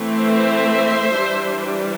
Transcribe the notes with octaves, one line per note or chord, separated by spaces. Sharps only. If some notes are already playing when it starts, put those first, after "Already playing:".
Already playing: E3 A3 C4
C5 E5
E3 G3 D4